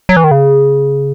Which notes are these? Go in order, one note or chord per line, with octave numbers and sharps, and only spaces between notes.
F#3
E3
D#3
C#3